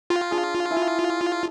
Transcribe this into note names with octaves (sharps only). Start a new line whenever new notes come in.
F4 G5 A#5
D4 G#4
E4 G#5